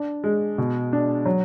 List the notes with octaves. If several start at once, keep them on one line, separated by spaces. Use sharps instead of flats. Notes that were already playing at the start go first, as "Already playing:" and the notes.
Already playing: D4
G#3
B2
D4
F#3